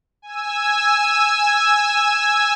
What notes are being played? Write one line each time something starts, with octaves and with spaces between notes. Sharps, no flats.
G#5 E6